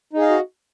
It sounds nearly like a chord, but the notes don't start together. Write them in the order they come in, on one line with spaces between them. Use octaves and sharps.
D#4 G#4 F5 D#5 F#4